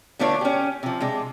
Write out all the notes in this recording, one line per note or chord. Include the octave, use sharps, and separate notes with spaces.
D3 A3 B3 D4 F4 C#5
C#4 G4
C3 F3
C3 G#3 D4